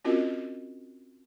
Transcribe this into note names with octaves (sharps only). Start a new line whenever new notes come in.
C4 C#4 F4 F#4 A#4 D#5